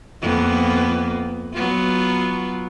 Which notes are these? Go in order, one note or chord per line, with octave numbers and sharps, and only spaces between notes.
F2 A#3 B3
F#3 B3 F4